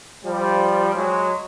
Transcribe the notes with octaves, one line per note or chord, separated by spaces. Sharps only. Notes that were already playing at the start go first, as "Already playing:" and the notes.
F3 G3
F#3 G#3